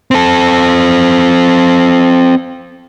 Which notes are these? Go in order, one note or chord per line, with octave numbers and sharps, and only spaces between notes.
C4 A4